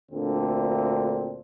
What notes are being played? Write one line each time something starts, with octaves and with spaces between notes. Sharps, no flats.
D2 A#2 D3 C4